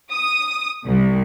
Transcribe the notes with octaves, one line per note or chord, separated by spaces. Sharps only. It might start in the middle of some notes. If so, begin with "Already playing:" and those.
D#6
C2